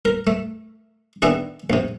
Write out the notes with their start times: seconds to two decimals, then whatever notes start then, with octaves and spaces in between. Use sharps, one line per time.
0.05 A#4
0.27 A3
1.22 D#3 B3 D4 E4 G#4
1.70 A#1 C3